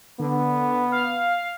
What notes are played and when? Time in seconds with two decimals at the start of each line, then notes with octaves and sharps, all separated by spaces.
0.19 D3 B3
0.92 F5